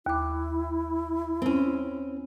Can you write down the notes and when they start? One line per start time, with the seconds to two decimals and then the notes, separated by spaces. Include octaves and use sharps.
0.06 D#2 E4 D6
1.42 C4 C#4